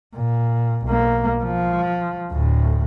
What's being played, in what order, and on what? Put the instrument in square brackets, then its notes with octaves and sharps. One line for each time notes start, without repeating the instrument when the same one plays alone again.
[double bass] A#2
B1 A#3
F3
D2 A2